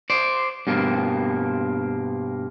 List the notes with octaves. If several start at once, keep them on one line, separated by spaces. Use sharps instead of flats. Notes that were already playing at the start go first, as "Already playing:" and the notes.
C5 D5
G2 B2 A#3 C4